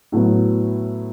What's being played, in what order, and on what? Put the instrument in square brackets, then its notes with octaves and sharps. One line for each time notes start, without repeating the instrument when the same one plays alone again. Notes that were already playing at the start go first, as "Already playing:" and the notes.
[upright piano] A2 F#3 B3